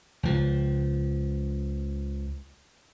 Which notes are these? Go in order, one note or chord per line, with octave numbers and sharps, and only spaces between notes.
C#2 F3